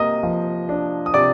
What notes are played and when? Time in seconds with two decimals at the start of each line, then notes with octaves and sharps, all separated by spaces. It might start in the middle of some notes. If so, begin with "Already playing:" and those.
Already playing: C3 A#3 D#5 D#6
0.23 F3
0.69 D4
1.06 D#6
1.14 C3 D5 D6